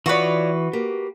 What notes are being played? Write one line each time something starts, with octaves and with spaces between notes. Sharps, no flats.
E3 F4 F#4 B4 C#5 D5 C#6 D#6
A#3 G4